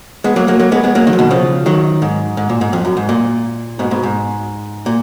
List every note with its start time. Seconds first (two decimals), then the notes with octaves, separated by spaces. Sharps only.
0.24 G#3 B3
0.36 F#3 A#3
0.48 F#3 A#3
0.59 F#3 A#3
0.72 G#3 B3
0.84 G#3 B3
0.95 F#3 A#3
1.07 D#3 F#3
1.13 F3
1.19 B2 D#3
1.31 C#3 F3
1.66 D#3 F#3
2.02 G#2
2.37 G#2
2.49 A#2
2.61 G#2
2.73 F2
2.85 F#2
2.97 G#2
3.09 A#2
3.79 G#2 B2
3.91 G#2 B2
4.03 G#2
4.86 A#2